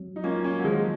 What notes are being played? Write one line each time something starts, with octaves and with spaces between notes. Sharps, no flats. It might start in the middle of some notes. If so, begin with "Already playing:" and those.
Already playing: F#3 C4
D#4
A#3 C#4 F4
A#3 C#4
F#3
D#3 F3 G#3